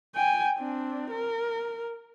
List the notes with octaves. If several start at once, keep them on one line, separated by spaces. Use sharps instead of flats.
G5 G#5
C4 D4
A#4